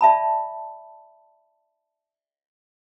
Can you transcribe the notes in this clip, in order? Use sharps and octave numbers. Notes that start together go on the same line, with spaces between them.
D5 E5 A5 B5